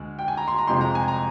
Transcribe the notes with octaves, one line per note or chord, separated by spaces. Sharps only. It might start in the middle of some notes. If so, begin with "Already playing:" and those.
Already playing: D2 G#3
G5
G#5
A#5
C6
A#5
F2 C3 F3 G#3 C6
A#5
G#5
A#5